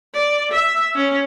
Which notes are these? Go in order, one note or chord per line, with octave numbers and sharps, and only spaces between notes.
D5
E5
C#4